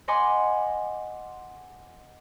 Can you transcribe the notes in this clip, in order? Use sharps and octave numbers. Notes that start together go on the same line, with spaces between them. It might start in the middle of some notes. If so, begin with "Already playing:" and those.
D#5 F#5 G#5 B5 C6 D6